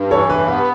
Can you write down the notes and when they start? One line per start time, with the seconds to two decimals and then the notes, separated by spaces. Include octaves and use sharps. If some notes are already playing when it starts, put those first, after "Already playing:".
Already playing: G2
0.11 E3 A4 C#5
0.30 G2 B4
0.48 B3 B4